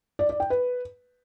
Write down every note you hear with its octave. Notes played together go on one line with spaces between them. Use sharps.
D5
D5
G5
B4